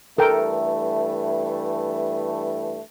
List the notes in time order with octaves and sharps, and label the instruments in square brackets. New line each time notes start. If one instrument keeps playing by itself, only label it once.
[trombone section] G2 E3 A3 [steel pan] A4 A#4 G5